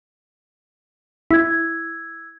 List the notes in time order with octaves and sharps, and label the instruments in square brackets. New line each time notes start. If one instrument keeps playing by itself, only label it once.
[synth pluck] E4 [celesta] E6 G#6